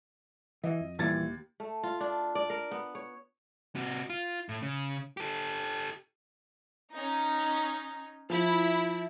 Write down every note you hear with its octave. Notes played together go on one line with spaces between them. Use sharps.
E3 D#5
F2
D#2 A#2 E3 G3 G#6 A6
A3
F4
D4
D5
A#4
B3
C#5
C3 F#4
F4
A2
C#3
G4 A4
C#4 D#4
F3 E4